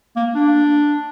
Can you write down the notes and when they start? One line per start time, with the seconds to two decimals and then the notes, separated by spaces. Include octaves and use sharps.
0.16 A#3
0.35 D4